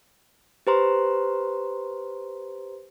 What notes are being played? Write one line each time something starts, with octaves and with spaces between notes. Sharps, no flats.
G4 B4 C5 A#5 C6